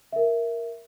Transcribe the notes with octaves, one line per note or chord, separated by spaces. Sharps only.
A#4 E5